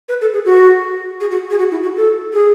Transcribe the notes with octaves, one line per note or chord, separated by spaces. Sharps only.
B4
A4
G#4
F#4
G#4
F#4
G#4
F#4
E4
F#4
A4
G#4